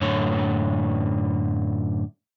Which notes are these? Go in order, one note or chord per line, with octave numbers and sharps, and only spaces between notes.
F#2 A2 D3 C#5